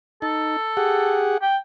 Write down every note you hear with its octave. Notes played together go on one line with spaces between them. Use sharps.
D#4 A4
G4 G#4 F#5
G5